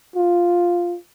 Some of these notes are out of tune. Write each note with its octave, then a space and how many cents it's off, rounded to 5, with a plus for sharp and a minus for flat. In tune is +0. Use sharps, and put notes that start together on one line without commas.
F4 +0